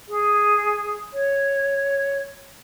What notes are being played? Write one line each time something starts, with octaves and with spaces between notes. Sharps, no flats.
G#4
C#5